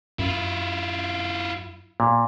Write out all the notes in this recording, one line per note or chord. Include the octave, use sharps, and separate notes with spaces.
F#2 E4 F4
A#2